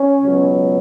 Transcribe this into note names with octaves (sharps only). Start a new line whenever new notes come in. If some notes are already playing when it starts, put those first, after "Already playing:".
Already playing: C#4
C#2 B2 F#3